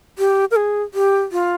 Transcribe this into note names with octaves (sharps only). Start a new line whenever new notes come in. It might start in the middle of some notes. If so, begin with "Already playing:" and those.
G4
A#4
G#4
G4
F4